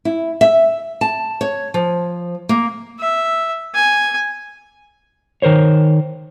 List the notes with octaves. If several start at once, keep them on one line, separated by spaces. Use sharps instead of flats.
E4
E5
A5
C#5
F3
A#3
E5
G#5
D#3 A#4 C5 C#5